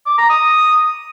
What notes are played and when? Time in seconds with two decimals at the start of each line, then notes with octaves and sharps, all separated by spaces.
0.06 D6
0.18 A#5
0.30 D#6